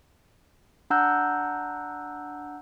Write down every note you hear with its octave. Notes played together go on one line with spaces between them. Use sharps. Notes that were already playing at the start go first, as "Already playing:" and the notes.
D4 F#5 A#5 E6 F#6 G6